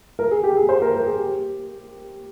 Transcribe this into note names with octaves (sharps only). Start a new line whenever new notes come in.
A#4
G#4
G4
G#4
C5
A#4
A#4
G#4
G4